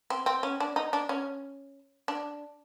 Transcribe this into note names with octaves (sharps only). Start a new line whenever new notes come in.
C4
C4
C#4
D4
D#4
D4
C#4
D4